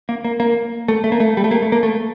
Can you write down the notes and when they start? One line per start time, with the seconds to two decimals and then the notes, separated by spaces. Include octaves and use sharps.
0.09 A#3
0.24 A#3
0.40 A#3
0.88 A3
1.04 A3
1.12 A#3
1.20 A3
1.37 G3
1.44 A3
1.51 A#3
1.62 A3
1.72 A#3
1.83 A3